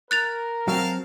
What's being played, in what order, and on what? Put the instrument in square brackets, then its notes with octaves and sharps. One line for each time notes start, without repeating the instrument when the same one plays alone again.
[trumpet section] A#4 [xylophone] F#6 A6 F7
[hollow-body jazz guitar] F#3 C4 [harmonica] F5 A5 F6